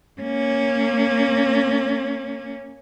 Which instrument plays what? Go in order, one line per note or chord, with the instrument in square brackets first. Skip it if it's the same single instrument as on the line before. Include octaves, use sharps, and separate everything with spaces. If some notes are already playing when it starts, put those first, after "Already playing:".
[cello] A#3 C#4